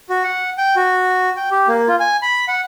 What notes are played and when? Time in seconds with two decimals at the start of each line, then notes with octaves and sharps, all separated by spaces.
0.09 F#4
0.24 F#5
0.58 G5
0.76 F#4
1.37 G5
1.51 G4
1.68 A#3
1.88 F4
2.00 G#5
2.22 B5
2.48 F#5